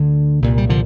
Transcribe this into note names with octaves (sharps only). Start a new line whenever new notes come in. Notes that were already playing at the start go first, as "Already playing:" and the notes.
Already playing: D2 D3
C2 A#2
G3
D3 F3